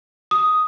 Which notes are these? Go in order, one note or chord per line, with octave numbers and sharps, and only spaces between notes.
D#6